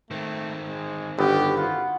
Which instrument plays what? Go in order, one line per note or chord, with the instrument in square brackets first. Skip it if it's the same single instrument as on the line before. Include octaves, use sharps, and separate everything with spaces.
[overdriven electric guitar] D#3 C4 [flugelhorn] A3
[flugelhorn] G#3
[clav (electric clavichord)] G1 [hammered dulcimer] B3 F#4 [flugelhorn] G4
[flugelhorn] F4 [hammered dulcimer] F#5